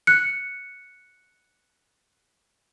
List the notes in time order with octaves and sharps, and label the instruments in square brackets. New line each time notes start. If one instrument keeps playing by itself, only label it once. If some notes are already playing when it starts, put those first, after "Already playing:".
[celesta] F#6 C#7